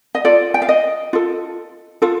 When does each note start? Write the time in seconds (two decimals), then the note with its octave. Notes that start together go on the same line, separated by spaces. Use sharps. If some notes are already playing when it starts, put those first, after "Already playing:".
0.15 D#5
0.25 F4 A4 D5
0.54 G5
0.62 F5
0.69 D#5
1.13 F4 A4
2.02 F4 A4